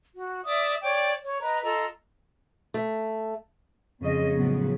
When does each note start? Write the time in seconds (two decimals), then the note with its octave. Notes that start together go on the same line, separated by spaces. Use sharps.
0.13 F#4
0.44 D5 E5 D6 D#6
0.81 C#5 D5 G5 D6
1.22 C#5
1.42 B4 D#5 A#5
1.63 F4 A4 D#5 A#5
2.74 A3
4.01 F2 C#3 G#3 D#5
4.36 A2 C#3 F3 F#3 B3